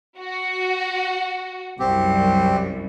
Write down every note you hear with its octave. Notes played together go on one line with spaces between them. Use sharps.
F#4
C2 F#2 C4 G4